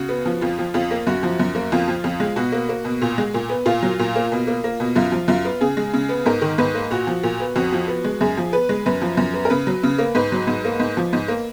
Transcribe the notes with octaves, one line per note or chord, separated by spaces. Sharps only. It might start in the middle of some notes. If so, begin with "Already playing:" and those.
Already playing: C#3 F#4
B3
F3
F2 F4
F3
F2 F4
A#3
F#2 F#4
F3
F#2
A#3
F2 F4
F3
F2
G#3
B2 F#4
A#3
A#3
B2
A#2
G#3
A#2
B3
A#2 F4
F#3
A#2
A#3
B2
A#3
A#3
B2
F#2 F4
F3
F#2 F4
B3
C#3 G#4
G#3
C#3
B3
G#2 A#4
D#3
G#2 B4
A#3
A#2 F#4
F3
A#2
B3
F2 F#4
F3
B3
G#3
F#2 G#4
F3
B3 B4
G#3
F#2 B4
F3
F#2
B3
A#4
C#3 B4
F#3
C#3
A#3
G#2 B4
F#3
G#2
A#3
G#2
F3
G#2
A#3